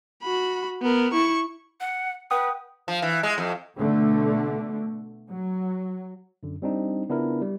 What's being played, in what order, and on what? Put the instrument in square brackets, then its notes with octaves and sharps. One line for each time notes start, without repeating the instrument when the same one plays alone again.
[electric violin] F#4 B5
B3 A#4
E4 C#6
[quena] F#5
[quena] B4 [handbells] F#5 G5 D#6
[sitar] F3
E3
G#3
F2
[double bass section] B2 D3 A3
F#3
[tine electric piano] F#2 D3
G3 C4 D4 D#4
C#3 B3 D4 E4 F4 A#4
G3